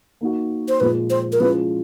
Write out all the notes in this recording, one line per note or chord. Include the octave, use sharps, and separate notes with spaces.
A#3 D#4 F#4
C5
A#2 F3 G#3 B4
C5
A#4
F3 G#3 C#4 E4 B4